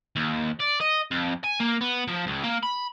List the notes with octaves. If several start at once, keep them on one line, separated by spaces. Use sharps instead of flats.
D#2
D5
D#5
F2
G#5
A#3
B3
F3
C#2
A#3
B5